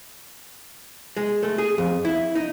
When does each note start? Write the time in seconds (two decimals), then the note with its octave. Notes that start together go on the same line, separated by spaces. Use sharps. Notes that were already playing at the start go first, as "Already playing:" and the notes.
1.17 G#3
1.43 A3
1.58 G#4
1.78 F2
2.05 E4
2.35 D#4